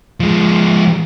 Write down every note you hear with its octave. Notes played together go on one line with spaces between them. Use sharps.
F3 G#3